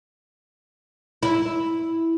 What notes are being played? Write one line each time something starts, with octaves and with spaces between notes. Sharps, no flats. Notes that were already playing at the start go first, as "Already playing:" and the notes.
E4